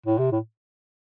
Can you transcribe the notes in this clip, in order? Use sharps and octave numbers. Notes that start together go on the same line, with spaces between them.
A2
C3
A2